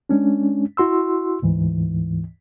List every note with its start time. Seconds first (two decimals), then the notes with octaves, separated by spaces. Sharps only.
0.09 G#3 C#4 D4
0.77 E4 F#4 C6 E6
1.42 D2 G#2 E3